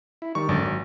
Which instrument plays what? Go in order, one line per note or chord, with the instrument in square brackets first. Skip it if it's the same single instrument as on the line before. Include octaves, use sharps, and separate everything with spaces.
[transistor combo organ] E4
[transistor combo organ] D#3 G3 [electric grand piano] C#6
[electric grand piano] G#1 [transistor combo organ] F#2 D3 D5
[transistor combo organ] F#3